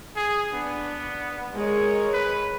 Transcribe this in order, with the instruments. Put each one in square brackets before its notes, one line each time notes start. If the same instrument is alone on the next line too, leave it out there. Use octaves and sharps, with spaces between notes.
[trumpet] G#4
[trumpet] B3 [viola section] D4
[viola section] G#3 A#4 C#5
[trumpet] B4